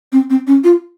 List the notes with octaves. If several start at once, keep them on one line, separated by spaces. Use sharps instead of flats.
C4
C4
C#4
F4